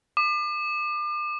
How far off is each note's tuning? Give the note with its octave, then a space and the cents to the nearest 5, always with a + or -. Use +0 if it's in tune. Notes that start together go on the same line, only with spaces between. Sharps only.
D6 +35